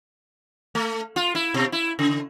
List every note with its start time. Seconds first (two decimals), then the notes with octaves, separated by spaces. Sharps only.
0.75 A3
1.16 F4
1.35 E4
1.54 B2
1.72 E4
1.99 C#3